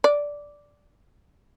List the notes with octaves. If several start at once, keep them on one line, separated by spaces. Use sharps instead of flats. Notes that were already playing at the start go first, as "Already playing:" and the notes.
D5